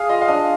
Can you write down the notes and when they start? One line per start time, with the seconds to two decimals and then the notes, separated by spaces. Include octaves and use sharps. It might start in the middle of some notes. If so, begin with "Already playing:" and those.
Already playing: G#4 F5
0.09 F4 D#5
0.22 F5
0.28 D4 D#5